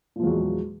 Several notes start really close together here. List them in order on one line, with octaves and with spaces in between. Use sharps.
A#2 F3 E2 F#3 G#3